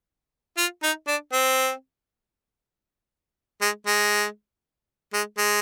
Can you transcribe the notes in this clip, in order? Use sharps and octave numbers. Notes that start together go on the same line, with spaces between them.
F4
D#4
D4
C4
G#3
G#3
G#3
G#3